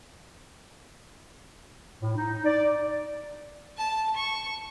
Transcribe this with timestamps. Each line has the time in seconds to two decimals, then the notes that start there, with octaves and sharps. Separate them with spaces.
2.01 A2
2.16 D#4
2.45 D5
3.77 A5
4.16 C#6